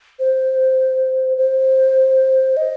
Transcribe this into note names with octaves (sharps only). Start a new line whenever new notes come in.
C5
C5
D#5